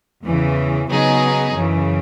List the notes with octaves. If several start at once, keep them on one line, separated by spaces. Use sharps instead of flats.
E2 C#3 E3
C#3 F#3 B3 D#4 G#4
F#2 C#3 E3